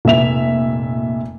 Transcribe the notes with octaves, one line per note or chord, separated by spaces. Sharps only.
F1 A#2 E5 F7